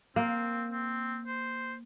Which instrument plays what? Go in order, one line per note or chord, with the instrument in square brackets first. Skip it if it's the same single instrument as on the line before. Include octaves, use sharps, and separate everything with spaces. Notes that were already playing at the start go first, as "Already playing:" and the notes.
[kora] A#3 [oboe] C4
[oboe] C4
C5